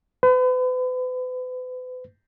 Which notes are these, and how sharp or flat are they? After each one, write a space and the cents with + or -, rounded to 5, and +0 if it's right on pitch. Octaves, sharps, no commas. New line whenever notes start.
B4 +40